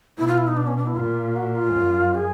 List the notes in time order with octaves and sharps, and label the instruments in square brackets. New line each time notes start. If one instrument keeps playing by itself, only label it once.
[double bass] B2 [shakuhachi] E4
[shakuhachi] F4
E4
D#4
D4
C#4
D4
E4
[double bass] A#2 [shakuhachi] F4
[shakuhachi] F#4
F4
[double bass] F#2
[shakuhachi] G#4